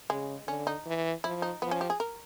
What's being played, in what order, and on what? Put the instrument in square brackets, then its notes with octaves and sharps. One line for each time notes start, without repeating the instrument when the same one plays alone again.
[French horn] C#3 [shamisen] G#3
[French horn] D3 [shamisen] C#4
[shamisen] D#4
[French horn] E3
[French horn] F3 [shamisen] E4
[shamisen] D#4
[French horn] F3 [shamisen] B3
[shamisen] C#4
G4
G#4
A#4